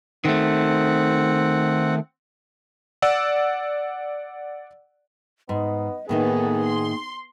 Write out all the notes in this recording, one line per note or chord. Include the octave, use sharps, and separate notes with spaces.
D#3 A3 C4 F#5
D5 F#5 E6
G#2 B3 D#5
A2 D#3 A#3 B3 D#4 G#4 A4
C6